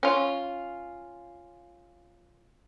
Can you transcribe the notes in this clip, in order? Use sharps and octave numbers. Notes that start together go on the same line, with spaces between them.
C#4 F4